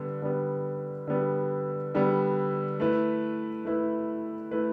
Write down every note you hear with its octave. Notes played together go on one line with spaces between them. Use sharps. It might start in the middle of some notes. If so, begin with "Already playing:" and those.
Already playing: D3 G3 B3
D3 G3 B3
D3 G3 B3
D3 G3 B3
A3 E4 B4
A3 E4 B4
A3 E4 B4